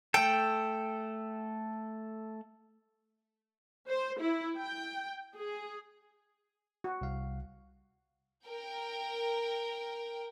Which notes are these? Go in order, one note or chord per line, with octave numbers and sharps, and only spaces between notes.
A3 A4 G5
C5
E4
G5
G#4
F#4
C2 F5
A#4 G5